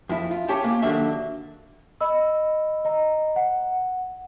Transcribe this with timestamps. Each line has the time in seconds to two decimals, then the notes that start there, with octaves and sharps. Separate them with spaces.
0.09 F2 E4
0.31 F4
0.48 C#4 G4 C#5 G5 A5
0.64 A#3 G4
0.82 D3 D#3 F#3 A#3 E5
2.01 D#5 B5 E6
2.85 D#5 A#5
3.36 F#5